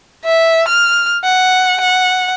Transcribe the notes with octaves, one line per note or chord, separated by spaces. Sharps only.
E5
F6
F#5
F#5